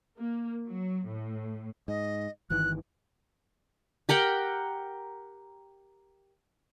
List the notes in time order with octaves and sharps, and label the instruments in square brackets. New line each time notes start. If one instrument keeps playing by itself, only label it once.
[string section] A#3
F#3
A2
[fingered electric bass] G#2 [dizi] D#5
[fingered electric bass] G1 D#3 E3 [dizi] F#6
[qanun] G4 A#4 F#5 G5